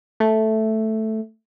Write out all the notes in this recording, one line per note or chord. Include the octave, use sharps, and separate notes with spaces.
A3